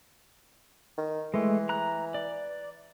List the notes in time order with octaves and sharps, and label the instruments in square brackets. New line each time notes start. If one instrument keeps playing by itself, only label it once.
[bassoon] D#3
[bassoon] E3 [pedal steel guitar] G#3 A3
[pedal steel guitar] A#5 F#6
D5